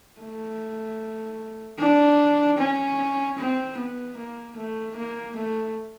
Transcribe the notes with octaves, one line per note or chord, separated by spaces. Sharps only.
A3
D4
C#4
C4
B3
A#3
A3
A#3
A3